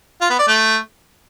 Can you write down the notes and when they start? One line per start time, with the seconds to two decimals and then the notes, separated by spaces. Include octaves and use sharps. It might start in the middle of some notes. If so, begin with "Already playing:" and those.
0.21 F4
0.30 B3
0.39 D5
0.48 A3